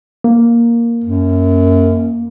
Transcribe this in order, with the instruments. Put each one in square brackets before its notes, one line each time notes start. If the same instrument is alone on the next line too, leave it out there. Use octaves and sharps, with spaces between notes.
[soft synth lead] A#3
[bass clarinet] F#2